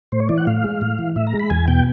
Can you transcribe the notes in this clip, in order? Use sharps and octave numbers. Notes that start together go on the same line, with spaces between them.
A2 C5
C#5
E3 D5
F#5
A2 F5
G#3
A2
E3
A2 E5
A#5
G#3
B5
E2 G#5
B2 G5